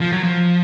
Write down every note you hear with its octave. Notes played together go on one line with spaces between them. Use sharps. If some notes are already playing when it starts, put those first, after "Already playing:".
F3
F#3
F3